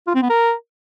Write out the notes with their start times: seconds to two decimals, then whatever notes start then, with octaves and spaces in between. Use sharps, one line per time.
0.07 F4
0.15 C4
0.22 B3
0.30 A#4